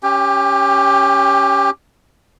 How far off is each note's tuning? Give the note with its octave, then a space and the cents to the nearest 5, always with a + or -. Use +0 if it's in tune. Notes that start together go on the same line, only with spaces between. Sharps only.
C#4 +0 G4 +10 G5 +35